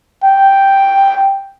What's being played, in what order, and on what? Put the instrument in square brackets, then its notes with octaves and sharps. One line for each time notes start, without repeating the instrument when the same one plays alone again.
[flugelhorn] G5